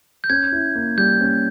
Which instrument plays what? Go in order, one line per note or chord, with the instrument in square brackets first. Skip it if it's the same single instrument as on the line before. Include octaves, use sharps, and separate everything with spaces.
[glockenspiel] G6
[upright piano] C#4 [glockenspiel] G#6
[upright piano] E4
A#3
[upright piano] G3 [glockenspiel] G6
[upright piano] C#4